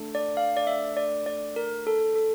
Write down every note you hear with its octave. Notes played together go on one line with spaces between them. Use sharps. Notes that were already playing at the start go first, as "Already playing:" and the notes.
Already playing: A3 D4 A4
D5
F5
D5
E5
D5
D5
A#4
A4
A4